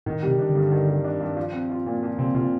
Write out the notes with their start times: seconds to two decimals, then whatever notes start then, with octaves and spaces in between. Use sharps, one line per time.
0.06 A2 D#3
0.23 C3 G3
0.39 D4
0.49 D3
0.55 G2
0.72 D#3
0.88 G3
1.05 D4
1.20 G2
1.36 F3
1.53 C4
1.70 F4
1.86 A#2
2.03 F3
2.19 C3 C4
2.34 C3 F4